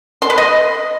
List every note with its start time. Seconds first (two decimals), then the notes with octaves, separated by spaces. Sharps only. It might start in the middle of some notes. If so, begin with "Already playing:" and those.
0.22 C6
0.30 B4
0.38 D#5